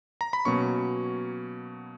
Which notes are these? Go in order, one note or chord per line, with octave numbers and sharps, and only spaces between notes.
A#5
B5
B2 F#3 A#3 C#4 C#6